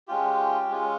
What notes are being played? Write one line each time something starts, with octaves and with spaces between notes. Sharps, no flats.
G#3 C#4 F4 G4
G#3 C#4 F4